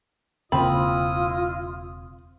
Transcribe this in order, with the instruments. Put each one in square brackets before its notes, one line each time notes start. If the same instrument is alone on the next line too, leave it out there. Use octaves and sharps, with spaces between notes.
[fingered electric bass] E1 C#3 A#3 [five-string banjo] C4 B5 [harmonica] E4 D#5 [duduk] F4